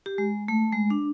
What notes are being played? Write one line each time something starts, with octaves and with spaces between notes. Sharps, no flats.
G4
G#3
A3
G#3
D4